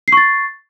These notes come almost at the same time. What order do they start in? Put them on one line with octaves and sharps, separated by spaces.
C7 C#6 A6